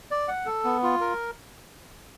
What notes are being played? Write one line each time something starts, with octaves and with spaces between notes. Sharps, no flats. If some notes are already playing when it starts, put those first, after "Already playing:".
D5
F#5
A4
B3
F4
A#4